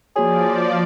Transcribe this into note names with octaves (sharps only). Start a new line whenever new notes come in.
F3 A#3 F#4 G#4 C#5 D5